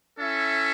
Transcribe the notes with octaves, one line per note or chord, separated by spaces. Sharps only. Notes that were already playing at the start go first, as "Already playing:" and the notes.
C#4 E4 A4 E5